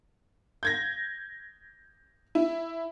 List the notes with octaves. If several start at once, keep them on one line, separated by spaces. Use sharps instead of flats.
G6 G#6 A#6
E4